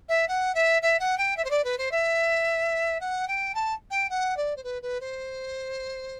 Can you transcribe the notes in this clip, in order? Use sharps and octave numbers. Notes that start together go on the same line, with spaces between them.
E5
F#5
E5
E5
F#5
G5
E5
C5
D5
B4
C5
E5
F#5
G5
A5
G5
F#5
D5
C5
B4
B4
C5